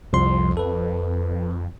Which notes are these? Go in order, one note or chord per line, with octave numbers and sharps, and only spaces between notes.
C2 F2 F3 C6
A4 B4